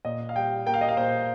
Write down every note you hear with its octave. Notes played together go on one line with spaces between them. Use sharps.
A#2 D#5
F5
G3 G5
A#3 G5
F5
D#5
F5
A#2 C5